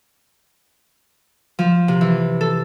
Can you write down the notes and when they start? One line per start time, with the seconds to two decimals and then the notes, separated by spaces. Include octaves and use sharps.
1.59 F3
1.88 C3
2.01 E3
2.41 A4